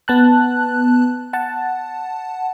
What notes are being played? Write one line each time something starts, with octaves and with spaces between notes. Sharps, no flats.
B3 A5 F#6
F#5 A5